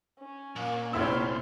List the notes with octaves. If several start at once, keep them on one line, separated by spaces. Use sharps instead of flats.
C#4
A#2 A#3
F1 B3 C#4 E4 G4 C5 C6 E6